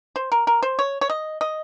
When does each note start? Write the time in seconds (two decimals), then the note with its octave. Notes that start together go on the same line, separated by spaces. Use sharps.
0.16 C5
0.32 A#4
0.47 A#4
0.63 C5
0.79 C#5
1.01 C#5
1.10 D#5
1.41 D#5